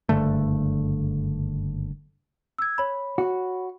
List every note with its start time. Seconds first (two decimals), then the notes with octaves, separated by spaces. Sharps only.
0.09 F#1 G2 D3 A3
2.58 E6 G#6
2.78 C#5 B5
3.18 F#4